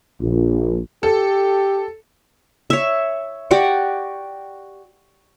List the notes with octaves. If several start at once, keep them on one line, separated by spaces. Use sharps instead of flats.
A#1
G4 A4
C#5 E5
F#4 G4 D5 F#5